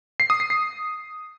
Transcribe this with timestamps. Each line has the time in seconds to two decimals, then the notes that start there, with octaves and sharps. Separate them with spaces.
0.20 C7
0.30 D#6
0.40 C7
0.50 C7